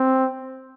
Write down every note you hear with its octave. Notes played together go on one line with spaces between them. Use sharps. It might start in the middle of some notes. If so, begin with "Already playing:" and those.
Already playing: C4